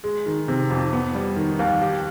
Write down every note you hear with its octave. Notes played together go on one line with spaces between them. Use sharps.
G#3
D#3
C3
F2
B3
G3
D#3
D#2
G4